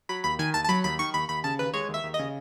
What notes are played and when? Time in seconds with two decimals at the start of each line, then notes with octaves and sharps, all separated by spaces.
0.09 F#3 B5
0.24 D#2 B5
0.39 D#3 G#5
0.54 D#2 A5
0.64 A5
0.69 F#3 B5
0.84 D#2 B5
0.99 D#3 C#6
1.14 D#2 B5
1.29 D#2 B5
1.44 C#3 A5
1.59 D#2 B4
1.74 G#3 C#5
1.89 D#2
1.94 E5
2.04 D#2
2.14 D#5
2.19 C#3